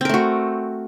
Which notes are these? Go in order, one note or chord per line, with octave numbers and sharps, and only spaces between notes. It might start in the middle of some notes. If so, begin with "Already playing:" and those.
A3 C4 F#4 A#4